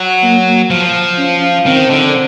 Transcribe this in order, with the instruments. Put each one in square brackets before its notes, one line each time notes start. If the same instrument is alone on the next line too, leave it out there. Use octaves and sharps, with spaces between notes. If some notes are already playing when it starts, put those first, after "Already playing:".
Already playing: [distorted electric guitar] F#3
[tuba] A#3
[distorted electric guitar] F3
[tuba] C#4
[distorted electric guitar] D#3 [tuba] C4
[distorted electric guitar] D3